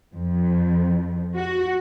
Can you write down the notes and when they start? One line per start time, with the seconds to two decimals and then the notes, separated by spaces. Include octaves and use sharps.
0.14 F2
1.37 F#4